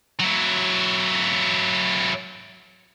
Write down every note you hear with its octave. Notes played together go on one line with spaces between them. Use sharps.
F#3 E4